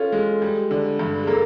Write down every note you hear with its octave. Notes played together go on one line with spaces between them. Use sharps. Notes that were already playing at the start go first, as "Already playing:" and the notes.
Already playing: C#4 F4 A4
G#3
G3
D3
G2
G#4
A#3 A4